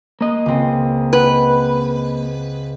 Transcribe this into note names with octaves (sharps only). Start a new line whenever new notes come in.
A#3 D#5
C#2 C4
B4 F#5 F#6